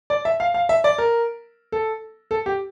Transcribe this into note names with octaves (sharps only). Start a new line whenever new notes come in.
D5
E5
F5
F5
E5
D5
A#4
A4
A4
G4